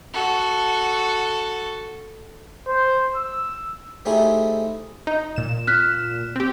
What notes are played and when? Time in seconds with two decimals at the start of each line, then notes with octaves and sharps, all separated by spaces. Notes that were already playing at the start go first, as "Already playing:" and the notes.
0.13 F#4 A4
2.68 C5
3.16 E6
4.06 A3 C4 D#4 E4 G4 G#4
5.07 D#4
5.36 A#2 E7
5.67 F6 F#6 B6
6.36 C4 G4